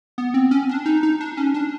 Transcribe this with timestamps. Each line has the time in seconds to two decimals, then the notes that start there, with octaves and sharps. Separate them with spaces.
0.18 B3
0.34 C4
0.51 C#4
0.69 D4
0.86 D#4
1.03 D#4
1.21 D4
1.37 C#4
1.54 D4